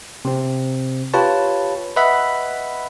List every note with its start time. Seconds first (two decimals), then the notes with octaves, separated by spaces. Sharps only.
0.25 C3 C4
1.14 F4 G4 B4 C#5 A5
1.96 B4 D#5 E5 F#5 B5